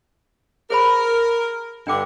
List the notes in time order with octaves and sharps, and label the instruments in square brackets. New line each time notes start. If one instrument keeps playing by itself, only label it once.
[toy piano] G#4 C5 B5 [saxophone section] A#4
[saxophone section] G2 D3 [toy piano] D4 G5 D6